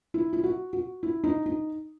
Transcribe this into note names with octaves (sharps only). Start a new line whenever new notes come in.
E4
E4
F#4
F#4
E4
D#4
D#4